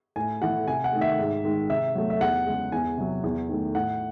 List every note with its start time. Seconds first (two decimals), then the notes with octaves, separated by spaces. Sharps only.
0.16 A2 G#5
0.42 E3 A3 F#5
0.67 C3 G#5
0.84 F#5
0.93 D#3 A3
1.01 E5
1.19 G#2
1.44 D#3 G#3
1.69 C3 E5
1.95 F#3 A3
2.10 E5
2.21 E2 F#5
2.46 C#3 G#3
2.72 E2 G#5
2.98 C3 F#3
3.24 E2
3.49 D#3 A3
3.75 A2 F#5